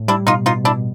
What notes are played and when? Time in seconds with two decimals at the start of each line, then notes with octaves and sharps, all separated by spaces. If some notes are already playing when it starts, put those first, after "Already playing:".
Already playing: A2
0.08 G3 D4 E4
0.27 B2 D#4 F4
0.46 B2 D#4 F4
0.64 B2 D4 E4